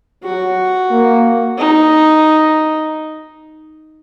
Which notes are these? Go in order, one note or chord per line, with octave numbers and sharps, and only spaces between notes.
F#3 F#4
A#3
D#4